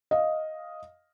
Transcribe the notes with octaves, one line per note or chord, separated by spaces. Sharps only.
D#5 F5